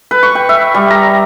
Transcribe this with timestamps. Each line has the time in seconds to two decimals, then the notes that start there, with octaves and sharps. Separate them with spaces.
0.11 B4
0.23 C#6
0.35 G5
0.49 E5
0.74 G3
0.90 A#5